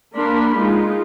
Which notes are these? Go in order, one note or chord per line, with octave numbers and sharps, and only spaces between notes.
A#3 D4 A#4 B5 C6
G#3 D#4 F4